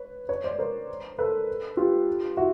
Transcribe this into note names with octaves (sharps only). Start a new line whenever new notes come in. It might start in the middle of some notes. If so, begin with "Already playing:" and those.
Already playing: B4 C#5
B4 C#5
C5 D5
A#4 C5
A4 B4
F4 G4
E4 F#4